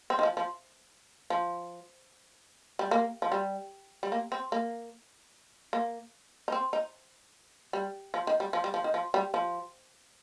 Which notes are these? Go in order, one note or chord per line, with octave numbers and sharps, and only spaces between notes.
C4
D#3
F3
F3
F3
G3
A#3
F3
G3
G3
A#3
C4
A#3
A#3
D#4
C4
D#4
G3
F3
D#3
G3
F3
G3
F3
D#3
F3
G3
F3